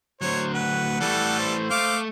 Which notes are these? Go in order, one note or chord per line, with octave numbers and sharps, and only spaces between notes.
D2 F#3 C5 C#5
B4 F#5
E3 G3 A3 A4
C5
A3 F5 D6